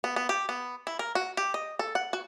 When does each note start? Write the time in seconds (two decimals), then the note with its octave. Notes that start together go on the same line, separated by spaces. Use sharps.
0.04 B3
0.16 B3
0.29 G4
0.49 B3
0.87 E4
0.99 A#4
1.15 F#4
1.37 G4
1.54 D#5
1.79 A4
1.95 F#5
2.13 F#4